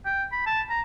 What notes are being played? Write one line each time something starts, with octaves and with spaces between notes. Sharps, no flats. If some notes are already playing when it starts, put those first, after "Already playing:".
G5
B5
A5
A#5